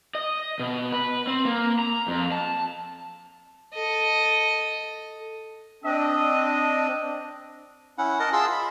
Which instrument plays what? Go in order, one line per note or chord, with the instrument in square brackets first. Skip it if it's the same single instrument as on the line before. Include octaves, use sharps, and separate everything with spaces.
[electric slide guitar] D#5
B2
B4
C4
A#3
A#5
F2
A5
[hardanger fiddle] A4 D#5
[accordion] C4 D4 [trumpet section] D#5
[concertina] C#4 E4 F#5
A#4 D#5 F#5 A5
F4 G#4 A5 C6 E6
B5